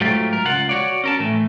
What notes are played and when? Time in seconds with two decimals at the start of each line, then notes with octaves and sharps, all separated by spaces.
0.01 G#2 F#3 A3 F4 G4
0.33 A#4
0.45 C#2 F4 F#5
0.69 F#4 C#5 D5
1.04 C#4 A#4 A5
1.20 A2 E3 A3